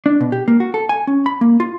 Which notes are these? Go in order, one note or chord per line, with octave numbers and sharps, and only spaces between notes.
D4
B2
G4
A#3
F#4
A4
G#5
C#4
B5
A#3
F4